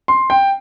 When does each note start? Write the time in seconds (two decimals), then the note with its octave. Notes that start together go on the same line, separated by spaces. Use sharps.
0.08 C6
0.30 G5